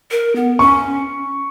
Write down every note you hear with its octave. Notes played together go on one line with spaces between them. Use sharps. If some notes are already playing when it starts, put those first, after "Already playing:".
A#4
B3
C#4 C#6